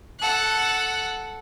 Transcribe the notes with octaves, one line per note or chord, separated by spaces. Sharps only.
A4 F#5